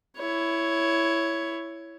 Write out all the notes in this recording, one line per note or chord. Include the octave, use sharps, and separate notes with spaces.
E4 C#5